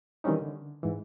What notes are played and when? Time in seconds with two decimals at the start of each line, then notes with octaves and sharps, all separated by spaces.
0.24 D#3 E3 G3 C4 C#4 D#4
0.41 D3
0.83 G#2 E3